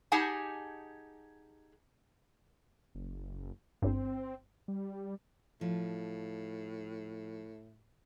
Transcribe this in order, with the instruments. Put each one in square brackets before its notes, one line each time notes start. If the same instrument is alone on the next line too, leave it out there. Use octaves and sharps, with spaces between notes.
[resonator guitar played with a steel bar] D#4 G4 G#4 F#5 G#5 A5
[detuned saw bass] F#1
[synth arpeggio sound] G1 G2 [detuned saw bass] C4
[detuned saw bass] G3
[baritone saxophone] A2 [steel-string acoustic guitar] F3